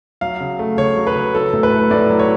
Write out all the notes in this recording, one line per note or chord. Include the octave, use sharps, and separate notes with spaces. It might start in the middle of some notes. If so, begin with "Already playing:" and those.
F#3 F5
C#3
A3
C#3 C#5
F#3
B4
C#3
F#3 A4
A2
B4
A3
A2 D5
F#3
C#5